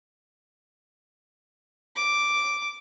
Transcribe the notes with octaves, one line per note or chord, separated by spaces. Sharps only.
D6